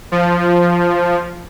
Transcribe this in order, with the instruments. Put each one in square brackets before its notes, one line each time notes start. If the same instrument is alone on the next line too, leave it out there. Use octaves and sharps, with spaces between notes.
[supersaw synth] F3